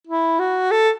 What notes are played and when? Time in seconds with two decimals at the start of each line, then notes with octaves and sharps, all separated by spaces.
0.07 E4
0.39 F#4
0.71 A4